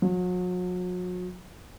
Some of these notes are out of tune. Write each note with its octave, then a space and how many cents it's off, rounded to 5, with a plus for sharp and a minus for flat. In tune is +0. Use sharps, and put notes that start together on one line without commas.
F#3 -40